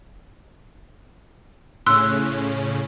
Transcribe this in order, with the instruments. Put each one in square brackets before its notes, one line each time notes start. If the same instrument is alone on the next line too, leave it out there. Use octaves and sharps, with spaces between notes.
[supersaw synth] A2 C#3 C#4 [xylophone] C6 E6 F#6